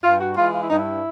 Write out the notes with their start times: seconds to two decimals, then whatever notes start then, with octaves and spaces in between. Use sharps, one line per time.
0.04 G2 F4
0.21 F#4
0.37 E3 G#3 F4
0.54 F4
0.62 E4
0.70 G2 D#4
0.78 E4